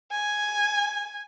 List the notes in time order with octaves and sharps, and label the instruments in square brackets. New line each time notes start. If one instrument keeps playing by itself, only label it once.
[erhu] G#5